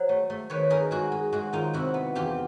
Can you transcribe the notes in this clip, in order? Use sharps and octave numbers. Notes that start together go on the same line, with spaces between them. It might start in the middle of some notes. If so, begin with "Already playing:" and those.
Already playing: F#3 C5
A3
A3
D#3 B4 C#5
D#4 G#4 A#4
G#3 F#4 G#4
G#3
G#3 F#4 G#4
D#3 D#4 F4
C3 E4 F#4
B3
E2 F4 G4